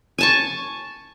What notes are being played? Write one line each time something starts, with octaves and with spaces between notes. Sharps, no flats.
G#5 A5 C#6